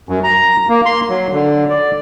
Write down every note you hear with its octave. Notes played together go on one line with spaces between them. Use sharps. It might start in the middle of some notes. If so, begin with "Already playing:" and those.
F#2
A#5
A#3
C6
F#3
D3
D5